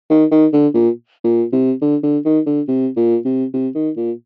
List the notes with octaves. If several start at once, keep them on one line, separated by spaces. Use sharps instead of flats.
D#3
D#3
D3
A#2
A#2
C3
D3
D3
D#3
D3
C3
A#2
C3
C3
D#3
A#2